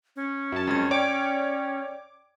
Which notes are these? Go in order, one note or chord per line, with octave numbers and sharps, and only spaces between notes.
C#4
F#2 A5
F2 G#3 G#6
C#5 D5 G5 D6